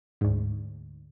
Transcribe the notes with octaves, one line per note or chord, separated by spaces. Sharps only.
D2 G#2